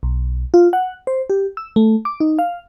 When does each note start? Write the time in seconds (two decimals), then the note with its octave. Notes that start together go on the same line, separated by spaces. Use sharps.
0.03 B1
0.54 F4
0.73 F#5
1.07 C5
1.30 G4
1.57 E6
1.76 A3
2.05 D6
2.20 D#4
2.39 F5